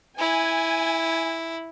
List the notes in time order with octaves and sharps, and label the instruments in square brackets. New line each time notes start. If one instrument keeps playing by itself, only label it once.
[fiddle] E4 [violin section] G#5